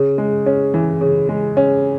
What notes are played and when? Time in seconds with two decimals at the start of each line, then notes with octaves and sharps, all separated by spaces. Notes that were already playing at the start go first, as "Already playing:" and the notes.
Already playing: C#3
0.18 G#3
0.46 C#4
0.74 E3
1.01 C#3
1.29 G#3
1.57 C#4